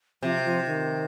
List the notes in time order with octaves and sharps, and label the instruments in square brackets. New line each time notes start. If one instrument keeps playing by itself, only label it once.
[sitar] C3 [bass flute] F3
[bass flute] F3
D#3